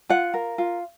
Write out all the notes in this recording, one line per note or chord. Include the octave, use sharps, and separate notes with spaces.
F4 F#5
A#4
F4